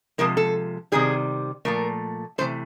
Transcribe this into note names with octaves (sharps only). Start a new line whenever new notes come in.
C3 F3 G#3 A#4
A4
C3 D#3 G3 G#4
A#2 F3 A3 A#4
C3 E3 A3 C5